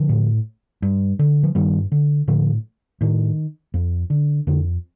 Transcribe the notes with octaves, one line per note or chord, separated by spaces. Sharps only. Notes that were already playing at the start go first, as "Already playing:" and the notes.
Already playing: D3 F3
A2
G2
D3
F3
G2 D#3 G3
D3
A2 D3 F3
A2 D#3
F2
D3
F2 D3